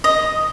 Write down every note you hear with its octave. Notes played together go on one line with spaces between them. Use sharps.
D#5